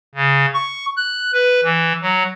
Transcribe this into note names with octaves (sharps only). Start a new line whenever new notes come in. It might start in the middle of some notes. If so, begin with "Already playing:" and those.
C#3
C#6
F#6
B4
E3
F#3